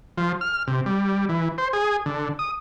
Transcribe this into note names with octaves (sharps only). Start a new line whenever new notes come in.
F3
F6
C3
G3
E3
C5
G#4
D3
D#6